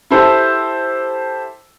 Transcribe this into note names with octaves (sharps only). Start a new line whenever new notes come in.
E4 G4 A4 C5